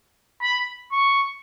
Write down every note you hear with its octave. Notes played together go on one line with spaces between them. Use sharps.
B5
C#6